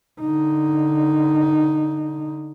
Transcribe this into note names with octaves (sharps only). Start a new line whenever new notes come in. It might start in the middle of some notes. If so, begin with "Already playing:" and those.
D3 D#4